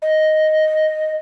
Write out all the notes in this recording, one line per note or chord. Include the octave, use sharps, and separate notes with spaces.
D#5